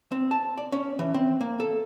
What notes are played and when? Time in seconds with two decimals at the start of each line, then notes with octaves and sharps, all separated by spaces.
0.12 C4
0.31 A5
0.57 D5
0.72 C#4
0.99 E3
1.14 C4
1.41 A#3
1.60 A4